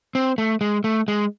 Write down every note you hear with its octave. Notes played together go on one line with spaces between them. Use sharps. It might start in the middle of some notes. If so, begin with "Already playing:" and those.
C4
A3
G#3
A3
G#3